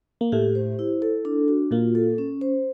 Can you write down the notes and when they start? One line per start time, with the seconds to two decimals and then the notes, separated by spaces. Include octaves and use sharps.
0.21 A#3
0.32 A2 A3 G4
0.55 C5
0.79 E4
1.02 A4
1.25 D4
1.48 F#4
1.71 A#2 A#3 F4
1.95 A4
2.18 C#4
2.41 C5